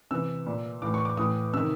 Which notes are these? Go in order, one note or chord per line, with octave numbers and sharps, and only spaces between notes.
C3 E3 E6
A#2
A2 E3 D6
C#6
D6
A2 E3 D#6
C3 D#3 E6